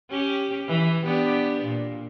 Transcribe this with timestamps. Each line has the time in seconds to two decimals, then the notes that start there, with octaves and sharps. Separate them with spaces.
0.10 C#4 G4
0.68 E3
1.04 B3 D4 G4
1.62 A#2